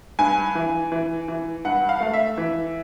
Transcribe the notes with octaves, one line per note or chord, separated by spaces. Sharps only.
G2 G#5
E3
E3
E3
G2 F#5
F5
A3 F5
E5
E3